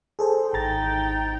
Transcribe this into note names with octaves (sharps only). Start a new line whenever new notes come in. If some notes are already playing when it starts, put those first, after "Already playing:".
G#4 A4 C5
G#1 D#4 G5 A#5 A6